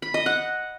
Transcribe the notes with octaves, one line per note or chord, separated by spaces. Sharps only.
B5
D#5
F#5